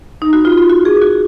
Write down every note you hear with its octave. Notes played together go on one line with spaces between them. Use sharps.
D#4
F#4
F4
F4
F#4
G#4
F#4